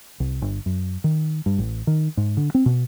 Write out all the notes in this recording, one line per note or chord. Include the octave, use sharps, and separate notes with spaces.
C2
G1
F#2
D#3
G2
A1
D#3
G#2
D3
C4
B2